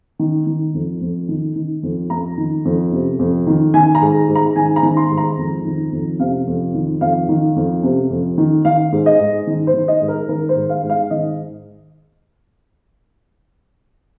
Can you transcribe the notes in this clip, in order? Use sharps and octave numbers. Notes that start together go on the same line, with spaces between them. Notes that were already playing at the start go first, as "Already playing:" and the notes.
D#3
D#3
F2
F2
D#3
D#3
F2
F2 A#5
D#3
F2
C3
F2
D#3
D#3 G#5
A#5
G#2
G#2
A#5
D#3 G#5
A#5
D#3
C6
G#2
A#5
F2
D#3
F2
C3 F5
F2
D#3
F2 F5
D#3
F2
C3
F2
D#3
D#3 F5
G#2
D#5
G#2
D#3
C5
D#3
D#5
G#2
A#4
D#3 A#4
C5
G#2
F5
G#2
F5
D#3 D#5